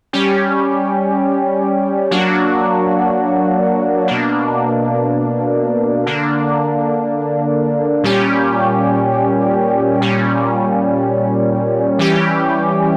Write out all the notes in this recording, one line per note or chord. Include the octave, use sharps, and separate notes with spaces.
G3 C#4 G4
F#3 A#3 D4 F#4
B2 A#3 D4
D3 A#3 D4
A#2 G3 C#4 G4
A#2 G3 C#4
E3 G3 C#4 G4